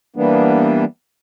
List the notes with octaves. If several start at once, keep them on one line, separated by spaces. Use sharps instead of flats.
E3 G3 A#3 B3 D4